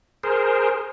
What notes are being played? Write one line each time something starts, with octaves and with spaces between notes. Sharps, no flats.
G#4 A#4 C5